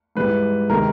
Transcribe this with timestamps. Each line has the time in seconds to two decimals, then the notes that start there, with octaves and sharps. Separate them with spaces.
0.16 G#2 E3 G3 B4
0.70 C3 D#3 G#3 A#4